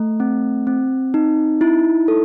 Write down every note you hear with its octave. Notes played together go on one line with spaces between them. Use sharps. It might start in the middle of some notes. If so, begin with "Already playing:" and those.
Already playing: A3
C4
C4
D#4
E4
A4